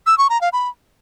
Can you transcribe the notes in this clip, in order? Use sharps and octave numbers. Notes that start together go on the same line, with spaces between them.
E6
C#6
A#5
F5
B5